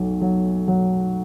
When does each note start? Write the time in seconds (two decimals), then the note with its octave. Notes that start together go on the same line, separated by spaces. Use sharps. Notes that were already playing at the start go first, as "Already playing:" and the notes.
Already playing: B1 F#3 A3
0.21 F#3
0.68 F#3